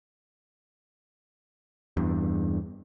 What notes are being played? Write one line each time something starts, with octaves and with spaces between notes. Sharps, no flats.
E2 G2